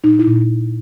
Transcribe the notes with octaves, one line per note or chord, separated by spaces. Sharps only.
A#2 D#4
E4
A#2